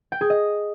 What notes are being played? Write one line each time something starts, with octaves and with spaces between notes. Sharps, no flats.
G5
G#4
D#5